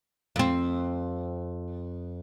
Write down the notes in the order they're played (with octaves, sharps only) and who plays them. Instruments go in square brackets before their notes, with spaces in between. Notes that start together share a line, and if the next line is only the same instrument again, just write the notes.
[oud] F2 C4